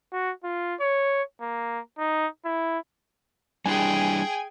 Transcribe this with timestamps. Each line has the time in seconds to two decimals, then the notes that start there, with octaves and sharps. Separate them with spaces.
0.13 F#4
0.44 F4
0.80 C#5
1.41 A#3
1.98 D#4
2.45 E4
3.66 G3 D4 E4 G#4 G5 G#5